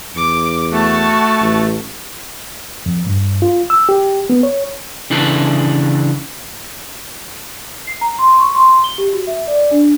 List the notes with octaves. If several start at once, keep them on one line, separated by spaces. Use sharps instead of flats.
E2 D6
A3 F#4 A5
A1
F2
G2
F4
E6
G4
B3
C#5
C#3 E3 D4 A4 B4
C7
A#5
C6
C#6
C6
G7
G4
F#4
E5
D5
D4